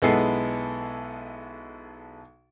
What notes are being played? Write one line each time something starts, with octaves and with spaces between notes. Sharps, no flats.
B1 G#3 B3 E4 A4 C7